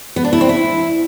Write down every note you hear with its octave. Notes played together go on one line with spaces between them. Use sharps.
B3
D4
E4
C4
E4